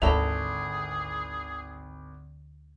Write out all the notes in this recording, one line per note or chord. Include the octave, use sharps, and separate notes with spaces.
G#1 D2 D3 E4 G#4 A4 A#5 F7